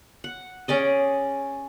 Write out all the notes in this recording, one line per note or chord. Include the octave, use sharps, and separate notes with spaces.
F#5
C#4 G#4 D5 D#5